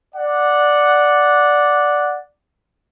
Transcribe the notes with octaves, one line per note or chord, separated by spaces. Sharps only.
D5 F#5